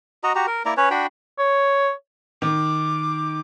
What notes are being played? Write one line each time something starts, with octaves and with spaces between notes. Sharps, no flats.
F#4 D#5 A#5
F#4 G4 A#5
A#4
A#3 E4 D5 A#5
C#4 B4 C#5
D4 F#4 G5 B5
C#5
D#3 D6